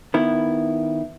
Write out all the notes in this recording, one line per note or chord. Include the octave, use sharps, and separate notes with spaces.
D#3 B3 E4